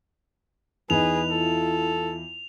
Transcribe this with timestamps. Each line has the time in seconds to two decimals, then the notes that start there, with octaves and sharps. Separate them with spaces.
0.90 E2 D#4 G#4 B4 F7
1.30 E4 F4 A4